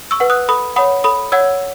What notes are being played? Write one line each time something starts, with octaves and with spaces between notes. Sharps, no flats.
C#6 E6
B4 F#5
D#6 F#6
A4 B5 D#6
C#5 F#5 B5 D#6
A4 B5 D#6
C#5 F#5 E6 G#6